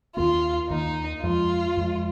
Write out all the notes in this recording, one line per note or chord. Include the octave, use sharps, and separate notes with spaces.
D#2 D#3 A#3 F4
D#2 D#3 A#3 D#4
F2 F3 G#3 F4
F2 F3 G#3